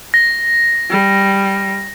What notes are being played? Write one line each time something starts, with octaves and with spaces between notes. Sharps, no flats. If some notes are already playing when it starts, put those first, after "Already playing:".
A#6
G3